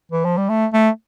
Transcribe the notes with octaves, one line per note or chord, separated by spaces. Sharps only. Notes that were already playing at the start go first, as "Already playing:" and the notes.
E3
F3
G3
A3
A3